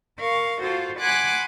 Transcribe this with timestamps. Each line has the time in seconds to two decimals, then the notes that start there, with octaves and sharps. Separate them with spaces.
0.18 A#4 F5 C#6
0.62 F4 F#4 A4 C5
0.99 F#5 G#5 B5 C6 D6 F#6